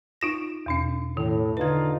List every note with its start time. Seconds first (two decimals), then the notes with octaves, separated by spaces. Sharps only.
0.21 D#4 F4 A#6
0.66 E2 B2 C#4
1.17 A2 D#3
1.57 D3 D#4 F4 B4 G#6